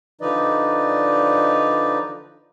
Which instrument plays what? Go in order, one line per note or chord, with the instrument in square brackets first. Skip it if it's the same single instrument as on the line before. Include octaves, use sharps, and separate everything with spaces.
[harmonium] D3 F3 D#4 B4 D5 D#5